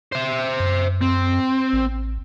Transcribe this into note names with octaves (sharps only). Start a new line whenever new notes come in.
C5 E5
F#2
C4
A1